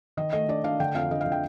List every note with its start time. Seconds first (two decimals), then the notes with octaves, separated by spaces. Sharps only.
0.17 D#3 D#5
0.33 A3 D#5
0.48 D4 D5
0.64 D4 F5
0.80 D3 G5
0.95 F2 F5
1.11 D3 D#5
1.21 F5
1.26 D3
1.32 G5